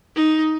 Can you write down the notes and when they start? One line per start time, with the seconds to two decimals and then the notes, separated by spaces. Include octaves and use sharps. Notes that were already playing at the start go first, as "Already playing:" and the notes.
0.16 D#4